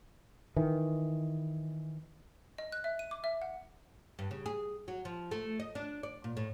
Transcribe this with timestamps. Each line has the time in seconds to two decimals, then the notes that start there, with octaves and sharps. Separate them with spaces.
0.56 D#3 E3
2.58 D#5
2.72 F#6
2.84 E5
2.99 D#7
3.11 D6
3.24 E5
3.42 F#5
4.19 G2
4.31 C#3
4.46 G#4
4.88 F#3
5.05 F3
5.31 A3
5.60 D#5
5.75 D4
6.03 D5
6.24 A#2
6.37 A2